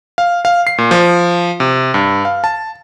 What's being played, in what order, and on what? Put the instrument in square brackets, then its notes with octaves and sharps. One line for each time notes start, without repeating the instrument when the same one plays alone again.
[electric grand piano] F5
F5
C7
A#2
F3
C3
G2
F5
A5